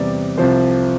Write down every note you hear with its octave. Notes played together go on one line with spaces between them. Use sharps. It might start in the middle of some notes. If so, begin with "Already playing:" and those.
Already playing: E2 C3 G3 D5
C2 C3 F3 C5